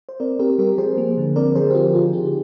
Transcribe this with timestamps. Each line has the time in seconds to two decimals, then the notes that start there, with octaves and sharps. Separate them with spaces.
0.09 C5
0.20 C4 A#4 D5
0.39 C4 G4 A#4
0.58 G3 G4 A#4
0.78 F3 G#4 C5
0.97 A#3
1.17 D3
1.36 C4 A#4 D5
1.55 F3 G#4 C5
1.70 G4
1.75 C4 F4 G#4
1.95 D3 F4 G#4
2.13 D3 D#4 G4